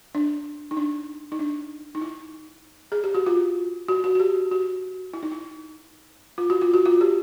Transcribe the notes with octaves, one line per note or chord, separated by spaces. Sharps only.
D4
D#4
D4
D#4
D4
D#4
E4
G#4
G4
F#4
F4
F#4
F#4
F#4
G4
F#4
E4
D#4
E4
F4
F#4
F4
F#4
F4
G4